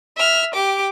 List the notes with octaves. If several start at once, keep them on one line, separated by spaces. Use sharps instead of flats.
E5 F6
G4 D6